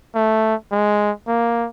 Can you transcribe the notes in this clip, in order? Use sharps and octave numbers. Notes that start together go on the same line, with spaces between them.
A3
G#3
A#3